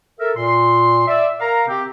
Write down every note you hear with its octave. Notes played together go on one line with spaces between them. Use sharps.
A4 A#4 E5
A#2 C6
D5 E5
A#4 F5 A#5
C3 C4 G4